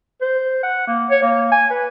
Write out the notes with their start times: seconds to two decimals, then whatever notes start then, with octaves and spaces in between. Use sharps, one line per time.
0.21 C5
0.63 F#5
0.87 A#3
1.10 C#5
1.22 A#3
1.51 G#5
1.70 B4